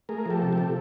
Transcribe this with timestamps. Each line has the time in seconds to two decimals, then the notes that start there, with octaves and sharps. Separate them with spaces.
0.09 A3 G#4 A#4
0.26 F3 G4 A4
0.42 C3
0.52 G4 A4
0.58 C3